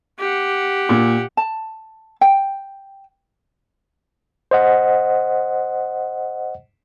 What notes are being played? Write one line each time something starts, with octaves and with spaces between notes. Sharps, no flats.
G4 F#5
A#2
A5
G5
C5 D#5 F#5